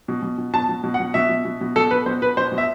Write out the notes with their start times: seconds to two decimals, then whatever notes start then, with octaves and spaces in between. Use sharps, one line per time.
0.08 B2
0.22 B2
0.38 B2
0.53 B2 A5
0.69 B2
0.84 B2
0.94 F#5
1.00 B2
1.14 B2 E5
1.29 B2
1.45 B2
1.61 B2
1.76 B2 A4
1.91 B2 B4
2.06 B2 C5
2.22 B2 B4
2.37 B2 C5
2.52 B2
2.58 E5